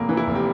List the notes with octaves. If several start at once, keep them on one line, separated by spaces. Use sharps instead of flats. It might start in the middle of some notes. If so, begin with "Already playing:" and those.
Already playing: F1 A#3
E3
E4
F1
G4